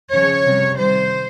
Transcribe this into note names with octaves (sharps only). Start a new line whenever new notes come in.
C#3 F3 C#5
C3 G3
C3 D#3 G3 C5